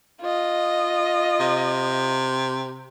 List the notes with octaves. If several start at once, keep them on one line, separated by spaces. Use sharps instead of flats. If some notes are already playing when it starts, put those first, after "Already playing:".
F4 D#5
C3